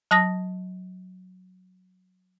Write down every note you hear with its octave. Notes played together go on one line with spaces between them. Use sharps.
F#3 A5 D#6 A#6